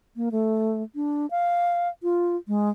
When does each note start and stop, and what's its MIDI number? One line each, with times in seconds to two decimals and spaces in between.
0.16 0.29 58
0.32 0.83 57
0.95 1.29 62
1.31 1.88 77
2.03 2.36 65
2.48 2.69 56